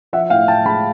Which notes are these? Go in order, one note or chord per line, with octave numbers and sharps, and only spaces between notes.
F3 E5 F#5
A2 F5 G5
A2 G5 A5
G#3 A5 B5